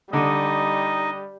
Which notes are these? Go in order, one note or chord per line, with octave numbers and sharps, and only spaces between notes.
D3 G3 D#4 D#5